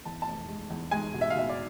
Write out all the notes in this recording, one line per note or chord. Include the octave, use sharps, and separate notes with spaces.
E2 A5
A5
F1
G#3
E2
G#3 G#5
B2
E5
F5
B2 E5
D5